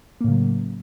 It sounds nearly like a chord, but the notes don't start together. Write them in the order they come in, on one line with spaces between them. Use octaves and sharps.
A#3 A2 C#3 F#3